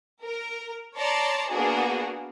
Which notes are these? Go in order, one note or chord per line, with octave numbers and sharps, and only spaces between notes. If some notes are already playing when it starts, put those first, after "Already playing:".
A#4
C#5 D5 A5 A#5 C6
A#3 B3 D4 F#4 G#4